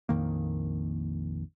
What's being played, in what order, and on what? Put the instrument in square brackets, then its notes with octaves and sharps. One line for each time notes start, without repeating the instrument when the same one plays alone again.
[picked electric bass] A#1 F2 D#3 A#3